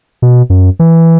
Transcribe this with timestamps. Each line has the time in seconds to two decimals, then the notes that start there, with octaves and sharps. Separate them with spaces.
0.22 B2
0.50 F#2
0.79 E3